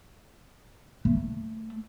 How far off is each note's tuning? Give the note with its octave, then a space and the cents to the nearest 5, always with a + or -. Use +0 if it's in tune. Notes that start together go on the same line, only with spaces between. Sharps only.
A3 +15